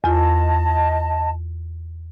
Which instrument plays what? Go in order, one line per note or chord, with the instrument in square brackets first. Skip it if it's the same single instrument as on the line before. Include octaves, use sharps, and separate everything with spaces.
[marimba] E2 F4 [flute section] D#5 A5